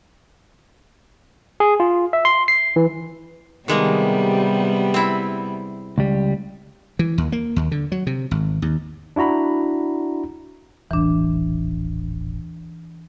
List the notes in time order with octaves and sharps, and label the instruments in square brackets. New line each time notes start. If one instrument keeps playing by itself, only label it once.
[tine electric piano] G#4
F4
E5
C6
C7
E3
[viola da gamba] C3 G3 B3 [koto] D#3 G#3 A#3
[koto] C4 E4
[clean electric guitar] C#2 G3
[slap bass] E3
D#2
A#3
D#2
D3
F#3
C3
G#1
D#2
[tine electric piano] D4 E4 F#4 A#5 B5
[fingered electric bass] D#1 A1 [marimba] E3 D4